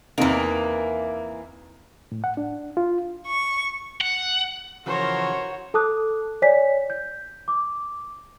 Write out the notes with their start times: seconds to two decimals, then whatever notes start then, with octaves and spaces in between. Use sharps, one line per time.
0.18 E2 C3 D#3 E3 A#3
2.12 A2
2.24 F#5
2.37 D4
2.77 F4
3.27 C#6
4.01 F#5
4.86 C#3 E3 F3 F#4 A#4 C5 C#5
5.74 A4 A5 D6 D#6 F#6
6.42 C#5 D5 G#5 B6
6.90 G6
7.48 D6